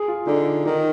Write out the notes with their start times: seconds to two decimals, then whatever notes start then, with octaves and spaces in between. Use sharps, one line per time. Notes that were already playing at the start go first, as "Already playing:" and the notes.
Already playing: G#4
0.08 F4
0.27 D3 D#4
0.66 D#3 D#4